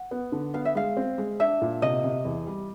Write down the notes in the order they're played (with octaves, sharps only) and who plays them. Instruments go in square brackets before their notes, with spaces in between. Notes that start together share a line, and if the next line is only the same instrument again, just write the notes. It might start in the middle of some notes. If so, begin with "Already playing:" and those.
Already playing: [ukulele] F#5
[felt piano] B3
D3
[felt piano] B3 [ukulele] F5
[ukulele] E5
[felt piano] G#3 [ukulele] F5
[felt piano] C4
G#3
[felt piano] D4 [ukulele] E5
[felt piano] A#2
[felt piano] C3 [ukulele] D#5
[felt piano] C3
E2
G3